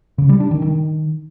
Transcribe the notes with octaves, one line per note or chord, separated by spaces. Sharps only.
C#3
G3
D4
D#3
D#3